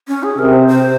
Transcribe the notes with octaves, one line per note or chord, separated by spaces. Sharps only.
C#4
G#4
C3 A#4
C5
C5